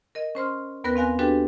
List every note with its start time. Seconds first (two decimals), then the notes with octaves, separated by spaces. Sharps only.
0.15 A#4 D#5
0.35 C#4 C5 C6 F6
0.84 D#2 B3 A#4 B4 F#6 A#6
0.96 C4 F5 G#5 F#6 A#6
1.19 D4 F#4 G4 A4 B4 G5